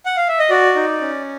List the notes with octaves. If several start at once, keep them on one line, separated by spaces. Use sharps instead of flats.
F#5
F5
E5
D#5
F#4 D5
D#4
C#4